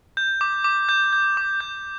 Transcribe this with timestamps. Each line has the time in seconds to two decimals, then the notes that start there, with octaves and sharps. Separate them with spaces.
0.17 G6
0.41 D6
0.64 D6
0.89 G6
1.13 G6
1.37 D6
1.60 G6